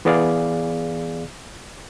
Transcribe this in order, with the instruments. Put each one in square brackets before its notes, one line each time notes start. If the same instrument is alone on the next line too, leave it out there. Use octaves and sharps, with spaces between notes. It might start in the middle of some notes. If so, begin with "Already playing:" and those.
[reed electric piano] E3 B3 G#4 D5 F5